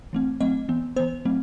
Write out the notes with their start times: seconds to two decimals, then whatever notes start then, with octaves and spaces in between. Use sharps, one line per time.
0.13 E3 A3 C4
0.41 F#3 A3 C4 D#5
0.69 E3 B3
0.96 E3 B3 C5
1.25 F#3 A3 C4